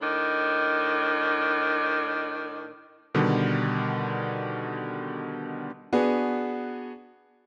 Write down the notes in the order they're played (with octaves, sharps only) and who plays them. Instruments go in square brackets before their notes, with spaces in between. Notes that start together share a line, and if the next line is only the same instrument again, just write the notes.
[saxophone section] A2 D#3 D4
[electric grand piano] B2 D3 D#3 G3
[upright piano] B3 D4 F#4 G#4 B4